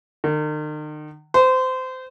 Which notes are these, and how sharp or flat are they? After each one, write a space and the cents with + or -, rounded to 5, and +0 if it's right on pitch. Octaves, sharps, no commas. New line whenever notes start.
D#3 -40
C5 -25